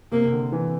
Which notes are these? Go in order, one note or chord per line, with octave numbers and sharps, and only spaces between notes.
C3 A#3
C3
D3
E3